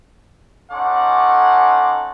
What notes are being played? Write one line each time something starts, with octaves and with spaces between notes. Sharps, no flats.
C#4 D#4 A4 F#5 C6 D6